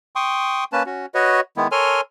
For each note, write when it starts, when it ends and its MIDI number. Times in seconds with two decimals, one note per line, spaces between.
0.16 0.64 79
0.16 0.64 84
0.16 0.64 85
0.16 0.64 87
0.73 0.83 58
0.73 0.83 61
0.73 0.83 71
0.73 0.83 81
0.86 1.06 61
0.86 1.06 66
1.14 1.40 66
1.14 1.40 71
1.14 1.40 73
1.14 1.40 75
1.57 1.68 51
1.57 1.68 56
1.57 1.68 59
1.57 1.68 64
1.72 2.01 69
1.72 2.01 70
1.72 2.01 73
1.72 2.01 80
1.72 2.01 84
1.72 2.01 89